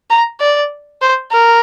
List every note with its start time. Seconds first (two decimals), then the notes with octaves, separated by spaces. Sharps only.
0.10 A#5
0.40 D5
1.02 C5
1.32 A#4